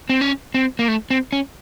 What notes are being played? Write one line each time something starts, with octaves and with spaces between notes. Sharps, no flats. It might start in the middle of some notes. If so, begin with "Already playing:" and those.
C4
C#4
C4
A#3
A3
C4
C#4